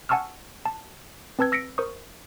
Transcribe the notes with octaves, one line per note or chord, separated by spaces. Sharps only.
F#5 G#5 A5 C#6 E6 F6
A5
C4 B4 A5 E6 G#6
E6 A#6 B6 C#7 D7
A#4 C5 C#6 D#6